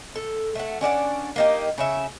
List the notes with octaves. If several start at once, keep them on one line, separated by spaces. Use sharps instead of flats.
A4
A3 F#5
C#4 D4 D5 F#5
A#3 D#4 G4
C#3 C#5 E5